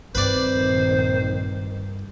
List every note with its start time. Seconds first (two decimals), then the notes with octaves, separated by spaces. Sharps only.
0.15 A#1 G2 D#3 C4 B4 C5 D5